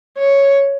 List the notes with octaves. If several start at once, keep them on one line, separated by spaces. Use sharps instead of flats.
C#5